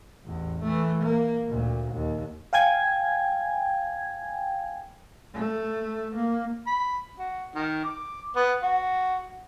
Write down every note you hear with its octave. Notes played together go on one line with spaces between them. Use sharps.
A1 E2
E3 A3
A#3
D2 A#2
D#2
F5 G5 G#5 G#6
A3
A#3
B5
F#4
D#3
D6
B3
F#4